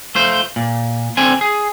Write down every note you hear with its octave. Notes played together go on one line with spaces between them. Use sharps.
A3 F4 C5
A#2
D3 C4 G#5
G#4